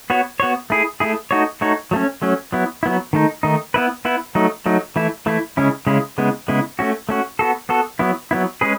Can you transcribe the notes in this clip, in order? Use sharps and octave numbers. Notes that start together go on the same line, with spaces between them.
B3 F#4 C#5
B3 F#4 C#5
A3 E4 G#4
A3 E4 G#4
A3 D#4 F#4 C#5
A3 D#4 F#4 C#5
F#3 A3 C#4
F#3 A3 C#4
F#3 B3 E4
F#3 B3 E4
D#3 A3 D#4
D#3 A3 D#4
B3 E4 B4
B3 E4 B4
F#3 A3 D#4
F#3 A3 D#4
E3 A3 E4
E3 A3 E4
C#3 G#3 C#4 E4
C#3 G#3 C#4 E4
C#3 G#3 B3 E4
C#3 G#3 B3 E4
A3 C#4 F#4
A3 C#4 F#4
B3 F#4 A4
B3 F#4 A4
F#3 B3 E4
F#3 B3 E4
G#3 C#4 G#4 B4